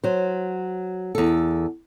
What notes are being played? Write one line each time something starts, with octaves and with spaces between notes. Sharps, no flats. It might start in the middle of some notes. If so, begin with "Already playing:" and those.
F#3 C5
E2 A4